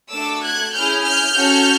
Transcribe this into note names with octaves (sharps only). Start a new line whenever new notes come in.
A3 D4 F#4 A4 D6 E6
F#6 G#6
C#4 E4 G#4 F6 G6
F6 G6
C#4 F#4 A4